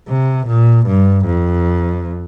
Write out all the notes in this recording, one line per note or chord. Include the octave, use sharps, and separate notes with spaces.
C3
A#2
G2
F2